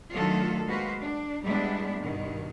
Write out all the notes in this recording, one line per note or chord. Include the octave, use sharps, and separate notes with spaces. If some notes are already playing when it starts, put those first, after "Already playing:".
D#3 F#3 A3 D4 F4 A4
G#3 A#3 F#4 B4 C5 F5
D4
A2 G3 G#3 B3 D4 E4
G2 B2 D#3